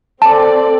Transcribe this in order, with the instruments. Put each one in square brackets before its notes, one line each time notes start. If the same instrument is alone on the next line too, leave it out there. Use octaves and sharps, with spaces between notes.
[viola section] C4 A4 D5 [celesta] A5